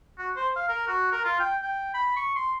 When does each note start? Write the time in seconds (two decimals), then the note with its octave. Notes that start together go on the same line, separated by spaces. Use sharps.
0.18 F#4
0.36 C5
0.56 F5
0.69 A#4
0.88 F#4
1.12 A#4
1.25 F4
1.40 G5
1.62 G5
1.94 B5
2.17 C#6
2.35 C6